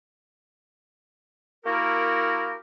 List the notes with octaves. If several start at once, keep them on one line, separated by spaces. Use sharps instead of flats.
A#3 E4 F#4 G4 A#4